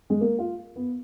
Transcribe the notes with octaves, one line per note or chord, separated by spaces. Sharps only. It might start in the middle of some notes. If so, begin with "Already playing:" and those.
G#3
A#3
F4
B3